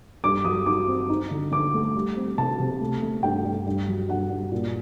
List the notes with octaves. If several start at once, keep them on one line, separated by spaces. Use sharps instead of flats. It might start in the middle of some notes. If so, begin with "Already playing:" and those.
G2 D6
F#3 D#6
D#4 D6
C4
D#4
D3
D3 D6
A3
G3
C4
C3 A5
C3
A3
A3
G2 G5
G2
G2
F#3
G2 F#5
G2
A#2